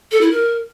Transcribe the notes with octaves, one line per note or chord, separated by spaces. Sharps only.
A4
E4
A#4